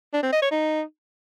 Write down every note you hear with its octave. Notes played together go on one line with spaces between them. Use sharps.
D4
C4
D#5
C#5
D#4